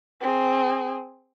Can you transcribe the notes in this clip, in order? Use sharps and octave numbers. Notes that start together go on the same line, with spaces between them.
C4 G#4